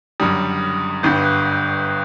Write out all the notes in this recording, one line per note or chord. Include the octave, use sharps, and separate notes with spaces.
F#1 F#2 D3 G3 D#6
G1 G2 D3 G6
F#6